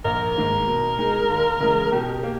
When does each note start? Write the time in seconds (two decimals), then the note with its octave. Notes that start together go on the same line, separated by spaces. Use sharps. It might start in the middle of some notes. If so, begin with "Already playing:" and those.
0.05 A#1 A#4
0.36 G#2 D#3 A#3
0.67 B2
0.98 G#3 D#4 G#4
1.30 D#2
1.60 C#3 E3 G#3
1.92 B2 G4
2.23 A#3